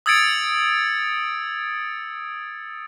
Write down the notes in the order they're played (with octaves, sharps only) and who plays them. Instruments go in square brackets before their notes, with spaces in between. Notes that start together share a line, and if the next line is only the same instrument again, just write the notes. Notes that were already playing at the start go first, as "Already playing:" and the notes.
[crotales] D#6 E6 G#6 A6 C#7 D7